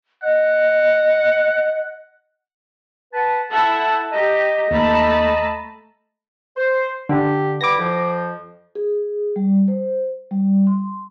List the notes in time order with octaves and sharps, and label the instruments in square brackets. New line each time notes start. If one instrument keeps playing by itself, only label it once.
[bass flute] D#5 [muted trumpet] F#5
[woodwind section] B4 F#5 A5
[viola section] E4 E5 F#5 [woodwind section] A4 A5
[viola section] G4 [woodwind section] D#5 A#5
[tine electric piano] D#2 [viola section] A3 A5 B5
[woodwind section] C5
[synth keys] D3 [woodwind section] G4
[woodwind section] G3 B3 E4 [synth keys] D6 A#6
[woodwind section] F2 F3
[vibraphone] G#4
G3
C5
G3
C6